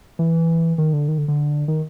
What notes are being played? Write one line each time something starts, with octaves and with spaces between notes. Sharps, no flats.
E3
D#3
D3
D#3
D3
D3
D#3